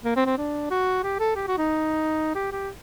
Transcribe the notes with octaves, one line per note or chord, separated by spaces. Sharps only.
A#3
C4
C4
D4
F#4
G4
A4
G4
F#4
D#4
G4
G4